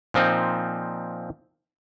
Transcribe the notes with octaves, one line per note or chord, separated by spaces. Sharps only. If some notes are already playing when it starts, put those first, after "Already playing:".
A#2 F3 C4 D#4